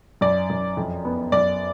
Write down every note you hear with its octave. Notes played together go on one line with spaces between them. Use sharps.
F#2 D5
F#2
F2
B3
F#2 D5